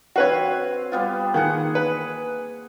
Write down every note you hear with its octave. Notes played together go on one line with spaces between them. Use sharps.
C4 F#4 B4 C#5 F5
G3 B3 F4
D#3 A#3 G#4 F#5
B4